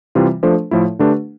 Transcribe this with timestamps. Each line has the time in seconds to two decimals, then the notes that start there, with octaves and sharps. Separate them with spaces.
0.15 C3 E3 G3 C4 F4
0.43 F3 A3 D4 A4 C5
0.71 A2 F3 A3 E4
0.99 D3 A3 D4 G4 B4